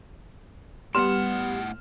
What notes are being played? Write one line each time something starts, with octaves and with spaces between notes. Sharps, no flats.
A2 G3 B3 F#5 C6 F6 E7